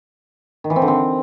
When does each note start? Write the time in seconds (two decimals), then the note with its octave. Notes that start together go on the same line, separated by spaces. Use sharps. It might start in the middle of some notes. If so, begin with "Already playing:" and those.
0.64 D#3
0.70 E3
0.76 C4
0.82 D3
0.88 C4